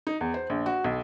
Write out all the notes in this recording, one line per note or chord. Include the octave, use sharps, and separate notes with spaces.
D#4
E2
C5
A#1
F#4
B1